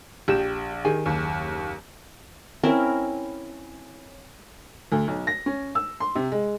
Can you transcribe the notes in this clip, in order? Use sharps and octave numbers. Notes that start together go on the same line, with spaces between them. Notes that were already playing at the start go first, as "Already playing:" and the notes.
A#1 G4 E7
D#3 G4 G#4 G#5
F#1 D#2
C4 C#4 E4 A#4
D2
B1
A#6
C#4
E6
C6
C3
G#3